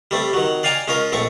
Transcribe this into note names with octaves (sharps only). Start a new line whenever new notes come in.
G3 A3 C4
D#3 F#3
D5 F5 G5 G#5 A#5
G#3 C#4 F4 A#4
A#1 A3 C4 C#6